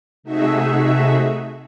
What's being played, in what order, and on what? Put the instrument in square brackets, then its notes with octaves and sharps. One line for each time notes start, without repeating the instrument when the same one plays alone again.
[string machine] C3 A3 D#4 F#4 G#4 E5